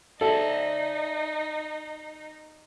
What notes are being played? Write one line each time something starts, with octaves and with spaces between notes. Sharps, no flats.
D#4 A4 D5 E5